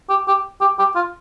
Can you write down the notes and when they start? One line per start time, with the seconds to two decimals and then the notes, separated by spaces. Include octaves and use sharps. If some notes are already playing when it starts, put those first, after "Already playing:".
0.10 G4
0.28 G4
0.61 G4
0.79 G4
0.96 F4